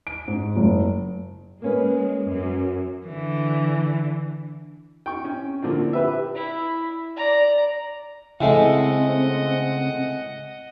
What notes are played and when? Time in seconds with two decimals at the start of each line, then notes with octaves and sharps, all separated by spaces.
0.07 D7
0.28 G#2
0.56 F#1
1.62 G#3 A#3 C#4 B4
2.27 F#2
3.06 D3 E3
5.06 G5 C#6
5.24 C#4
5.62 A#2 D3 F3 C4
5.93 G4 B4 E5
6.35 E4
7.17 D5 A#5
8.41 A2 C#3 G#3 A3 C4 D#5 F#5